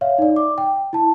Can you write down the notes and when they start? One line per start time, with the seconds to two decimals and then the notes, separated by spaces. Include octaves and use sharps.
0.01 C#5 E5 F5
0.18 D#4 D5
0.36 D6
0.58 G5
0.93 E4 A5